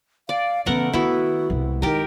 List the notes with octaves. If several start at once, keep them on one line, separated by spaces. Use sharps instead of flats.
D5 F5
C#3 E3 A3 B3 A#4 F#5
D#3 B3 E4 F#4
C2 G#3
D#3 G#3 G4 A#4